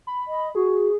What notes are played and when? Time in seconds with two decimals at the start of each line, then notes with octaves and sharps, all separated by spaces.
0.07 B5
0.27 D#5
0.55 F#4 G#4